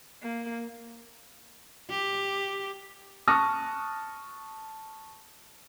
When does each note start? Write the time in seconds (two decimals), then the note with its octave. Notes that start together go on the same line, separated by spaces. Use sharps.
0.22 A#3
1.90 G4
3.27 A5 C#6 D#6 F6 F#6 A#6